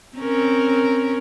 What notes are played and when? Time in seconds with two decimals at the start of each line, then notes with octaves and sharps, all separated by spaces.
0.16 C4 C#4 A#4